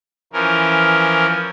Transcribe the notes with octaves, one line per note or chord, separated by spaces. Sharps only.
E3 F3 C#4 A#4